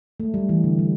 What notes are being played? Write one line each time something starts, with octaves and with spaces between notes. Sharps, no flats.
A3
G3
E3
D3
G3